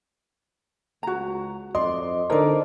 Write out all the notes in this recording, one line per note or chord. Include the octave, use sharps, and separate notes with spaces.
C#2 F#4 A#5
F2 D5 D#5 C6
D3 D#4 A4 A#4 C5 D5